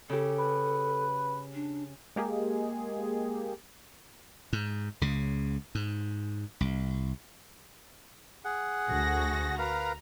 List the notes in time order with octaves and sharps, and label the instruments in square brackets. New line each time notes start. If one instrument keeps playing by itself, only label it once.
[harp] C#3 G4 [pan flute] A4
[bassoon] B4
[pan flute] D4
[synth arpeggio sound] G#3 A#3 G4 G#4
[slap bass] G#2
C#2 C#3
G#2
C2
[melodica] G#4 F#5
[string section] D2 F#4 A#6
[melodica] A#4 B4 F5 [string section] A#5